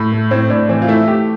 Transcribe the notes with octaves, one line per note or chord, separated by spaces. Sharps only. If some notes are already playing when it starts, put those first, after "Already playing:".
Already playing: A2
A3
A2 C4
A2 D4
E3 C4
F4
A3 E4
A3 G4